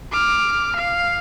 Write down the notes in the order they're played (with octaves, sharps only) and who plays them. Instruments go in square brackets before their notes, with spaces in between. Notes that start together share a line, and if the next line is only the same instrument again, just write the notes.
[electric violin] D6 F6
F5